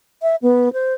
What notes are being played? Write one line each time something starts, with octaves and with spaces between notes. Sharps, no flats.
E5
B3
C5